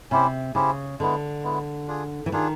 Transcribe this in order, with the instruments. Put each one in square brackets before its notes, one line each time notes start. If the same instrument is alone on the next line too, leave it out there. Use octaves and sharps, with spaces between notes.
[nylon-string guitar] C3 [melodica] C#4 E4 G4 C5
[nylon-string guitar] C#3 [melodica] C#4 E4 G4 C5
[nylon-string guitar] D3 [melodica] G#3 B3 E4
[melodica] G#3 B3 E4
D4 F4 G#4
[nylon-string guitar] E3
[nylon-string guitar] D#3 [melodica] D4 F4 G#4